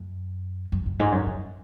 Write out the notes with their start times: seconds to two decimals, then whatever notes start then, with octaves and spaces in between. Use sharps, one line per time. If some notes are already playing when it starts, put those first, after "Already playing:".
Already playing: F#2
0.72 F#2
0.86 F#2
1.00 G#2
1.12 F#2
1.26 F#2